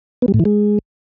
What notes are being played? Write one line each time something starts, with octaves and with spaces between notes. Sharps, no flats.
B3
G3
A2
E3
G#3